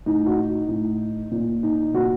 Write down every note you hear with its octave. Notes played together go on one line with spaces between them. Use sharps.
A2 D#4
F#4
D#4
A2
A#2
D#4
A#2 F#4